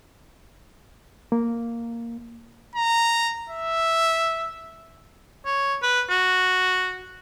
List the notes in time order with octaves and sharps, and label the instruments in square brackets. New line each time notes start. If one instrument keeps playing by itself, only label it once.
[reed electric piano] A#3
[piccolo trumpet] A#5
E5
[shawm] C#5
B4
F#4